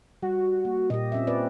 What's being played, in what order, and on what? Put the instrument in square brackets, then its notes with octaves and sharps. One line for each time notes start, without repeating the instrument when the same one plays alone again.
[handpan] G3 [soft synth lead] F#4
[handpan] A#3
[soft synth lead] A#2 [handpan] G4 D#5
[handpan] C4 C#4 E5
C4 B4 D5